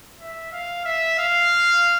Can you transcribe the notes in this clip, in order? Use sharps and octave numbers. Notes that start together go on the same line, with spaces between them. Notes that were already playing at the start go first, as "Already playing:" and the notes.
E5
F5
E5
F5